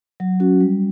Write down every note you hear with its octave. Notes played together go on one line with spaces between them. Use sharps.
F#3
C#4 F#4
G3